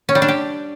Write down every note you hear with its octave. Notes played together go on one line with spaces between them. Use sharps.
C#4
G3
D4
G4